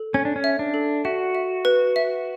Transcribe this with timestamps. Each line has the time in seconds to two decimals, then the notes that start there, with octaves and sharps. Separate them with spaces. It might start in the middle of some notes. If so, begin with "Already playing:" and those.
Already playing: A4
0.14 C#4 G#5
0.25 D4
0.36 C#4
0.44 E5
0.59 D4
0.74 A4
1.05 F#4 E5
1.35 E5
1.65 B4
1.96 E5